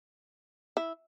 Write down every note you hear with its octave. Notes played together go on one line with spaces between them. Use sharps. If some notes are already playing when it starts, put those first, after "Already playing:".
E4